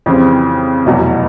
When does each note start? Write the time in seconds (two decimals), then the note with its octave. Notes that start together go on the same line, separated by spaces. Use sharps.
0.06 F2 C#3 E3 G3 C4
0.86 F1 E2 B2 F#3